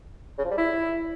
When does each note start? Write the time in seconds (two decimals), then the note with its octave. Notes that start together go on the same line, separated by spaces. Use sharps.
0.38 C#3
0.45 F3
0.51 G3
0.58 E4